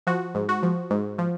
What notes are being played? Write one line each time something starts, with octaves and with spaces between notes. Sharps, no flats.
F3 F#4
G#2
F#4
F3
G#2
F3